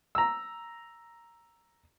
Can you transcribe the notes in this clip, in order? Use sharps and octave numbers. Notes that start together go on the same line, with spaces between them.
A#5 E6